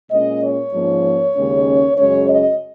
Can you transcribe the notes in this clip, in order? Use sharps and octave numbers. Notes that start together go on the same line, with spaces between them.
A#2 G#3 C#4 D#5
C#5
G#2 F3 A#3 C#4
D#2 C#3 G#3 C#4
F#2 C#3 G#3 C#4 C#5
D#5